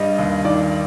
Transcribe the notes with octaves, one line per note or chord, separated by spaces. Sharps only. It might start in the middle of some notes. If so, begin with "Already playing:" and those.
Already playing: G2 G3 D#5
D#2
D#3 D5